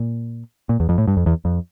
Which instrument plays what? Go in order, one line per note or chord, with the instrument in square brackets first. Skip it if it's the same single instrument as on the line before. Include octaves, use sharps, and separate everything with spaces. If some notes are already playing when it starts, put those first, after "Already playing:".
Already playing: [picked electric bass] A#2
A#2
E2
F2
A2
G2
F2
E2
F2